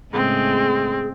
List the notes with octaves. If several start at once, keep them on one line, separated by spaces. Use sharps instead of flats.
A2 C#3 G#3 C4 G#4